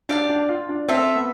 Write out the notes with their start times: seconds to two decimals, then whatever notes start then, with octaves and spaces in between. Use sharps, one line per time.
0.09 D4 G4 D5 F5 A5
0.29 D4
0.49 F4
0.69 D4
0.88 C4 F4 A4 E5
1.15 B3